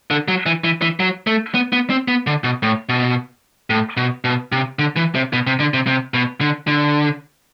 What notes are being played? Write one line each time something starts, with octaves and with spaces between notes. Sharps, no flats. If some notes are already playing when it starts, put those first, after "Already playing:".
D3
F#3
E3
E3
E3
F#3
A3
B3
B3
C4
B3
D3
B2
A2
B2
A2
B2
B2
C3
D3
E3
C3
B2
C3
D3
C3
C3
B2
D3
D3